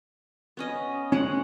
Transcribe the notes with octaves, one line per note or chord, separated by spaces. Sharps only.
B3 C#4 D#5
G#3 C#4 F#5